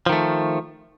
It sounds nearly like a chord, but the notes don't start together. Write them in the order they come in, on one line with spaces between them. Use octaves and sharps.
F3 D#3 A3